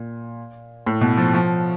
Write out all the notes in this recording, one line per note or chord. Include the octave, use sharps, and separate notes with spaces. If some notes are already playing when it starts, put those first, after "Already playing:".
Already playing: A#2
A2
B2
F3
F3